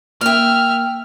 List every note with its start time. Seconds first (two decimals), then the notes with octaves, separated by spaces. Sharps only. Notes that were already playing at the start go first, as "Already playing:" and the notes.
0.21 A#3 E5 G5 F6